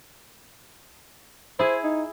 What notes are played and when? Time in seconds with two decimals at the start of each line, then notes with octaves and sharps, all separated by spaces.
1.59 E4 G#4 C5
1.84 D#4